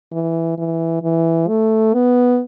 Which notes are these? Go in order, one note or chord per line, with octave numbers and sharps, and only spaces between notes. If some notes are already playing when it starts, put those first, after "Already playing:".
E3
E3
E3
A3
B3